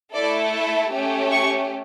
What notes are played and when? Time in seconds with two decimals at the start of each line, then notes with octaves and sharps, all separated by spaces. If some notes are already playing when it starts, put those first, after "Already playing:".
0.13 A3 E4 A4 D5
0.54 E5
0.92 A3 C#4 G4
1.32 C#6